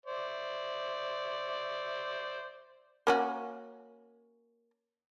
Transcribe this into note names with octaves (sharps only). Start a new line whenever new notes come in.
C5 D5 E5
A#3 C#4 F#4